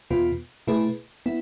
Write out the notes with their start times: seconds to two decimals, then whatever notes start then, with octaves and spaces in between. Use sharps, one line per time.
0.11 E2 B2 B3 F4
0.67 B2 A3 E4 G#4 B4
1.26 B3 E4